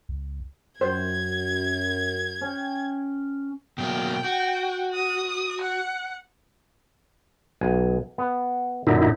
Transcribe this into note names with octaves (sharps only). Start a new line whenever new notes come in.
C#2
F#2 C5 G#6
C#4 G5
B2 F#3 A#3 G5
F#4
D#6
F#5
B1 G#5
B3
F#2 A#2 D3 D#4 E4